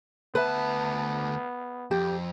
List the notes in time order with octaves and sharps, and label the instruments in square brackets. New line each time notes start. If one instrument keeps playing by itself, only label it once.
[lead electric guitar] D2 A5 [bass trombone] B3 [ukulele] B4 E5
[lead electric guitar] F2 [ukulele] G4